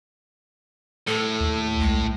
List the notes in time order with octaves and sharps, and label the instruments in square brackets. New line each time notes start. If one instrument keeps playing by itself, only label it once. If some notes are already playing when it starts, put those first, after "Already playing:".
[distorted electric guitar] A2 [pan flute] A4
[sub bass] D#2
[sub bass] C2 [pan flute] G#3